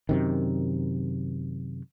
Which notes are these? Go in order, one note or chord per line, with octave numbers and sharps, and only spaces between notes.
F#2 C3 D#3